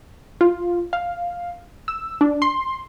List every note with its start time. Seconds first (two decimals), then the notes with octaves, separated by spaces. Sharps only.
0.41 F4
0.93 F5
1.88 E6
2.21 D4
2.42 C6